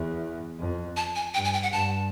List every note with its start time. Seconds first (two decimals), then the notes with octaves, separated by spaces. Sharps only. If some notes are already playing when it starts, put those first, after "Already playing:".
Already playing: E2
0.59 F2
0.97 A5
1.15 G#5
1.34 G2 G5
1.44 G#5
1.53 G5
1.63 F#5
1.72 G2 A5